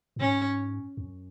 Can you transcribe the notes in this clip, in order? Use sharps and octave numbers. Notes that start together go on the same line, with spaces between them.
F#2
G#2 C#4
E2
F#2